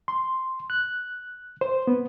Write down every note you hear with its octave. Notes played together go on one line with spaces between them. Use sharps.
C6
F#6
C5
B3